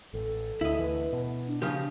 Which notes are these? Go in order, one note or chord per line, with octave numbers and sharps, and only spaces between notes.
A1 A4
D2 E4 D#5
D2 E3 B4
B2
D4
C#3 F3 G4